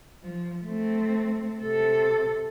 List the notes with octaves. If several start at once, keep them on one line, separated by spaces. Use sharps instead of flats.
F3
A3 C4
C3 A4